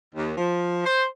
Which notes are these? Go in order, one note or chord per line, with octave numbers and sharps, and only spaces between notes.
D#2
F3
C5